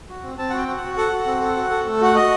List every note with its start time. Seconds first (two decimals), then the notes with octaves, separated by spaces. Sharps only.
0.09 F#4
0.23 C4
0.38 C4 A5
0.50 F#5
0.53 F#4 G5
0.68 F#4
0.77 F#5
0.82 F#4
0.97 A4 F#5
1.13 F#4
1.26 C4
1.41 A4
1.57 F#4
1.71 A4
1.86 A3
2.01 F#4 F#5
2.15 F#4 D#5